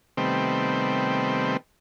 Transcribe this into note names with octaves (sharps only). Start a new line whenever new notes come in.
C3 D#3 G3 A3 B3 C4